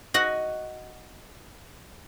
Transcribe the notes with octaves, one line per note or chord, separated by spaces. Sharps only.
F#4 D#5 F#5